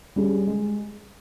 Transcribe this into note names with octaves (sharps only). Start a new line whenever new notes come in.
G3 C#4 G#4
G#3